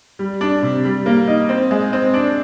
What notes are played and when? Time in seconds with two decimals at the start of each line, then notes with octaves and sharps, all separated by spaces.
0.19 G3
0.41 D4
0.62 C3
0.85 G3
1.06 A#3
1.27 D#4
1.49 C4
1.71 G#3
1.93 C4
2.14 D4